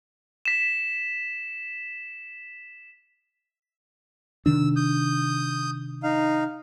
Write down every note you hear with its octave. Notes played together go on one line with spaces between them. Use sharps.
B6 E7
C3 D#3 D4 E6
D#6 G6
D#4 F5